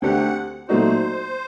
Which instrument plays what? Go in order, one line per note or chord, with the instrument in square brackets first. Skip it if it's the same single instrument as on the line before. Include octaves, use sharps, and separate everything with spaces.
[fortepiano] D2 D3 A3 C4 G4 [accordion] F#5
[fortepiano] A#2 F#3 A3 D#4 F#4 [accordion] C5